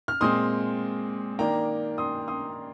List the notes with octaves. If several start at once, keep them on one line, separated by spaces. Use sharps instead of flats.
F6
A#2 G#3 C4 C6 D#6
D#3 A#3 D4 G5 A#5
C6 D#6
C6 D#6